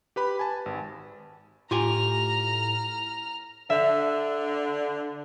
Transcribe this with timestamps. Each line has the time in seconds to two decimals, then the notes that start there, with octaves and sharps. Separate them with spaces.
0.16 G4 B4 B5
0.39 G#5 A5
0.66 G#1
1.71 A2 F4 G4 G#5 A#5 F6
3.70 D3 D4 E5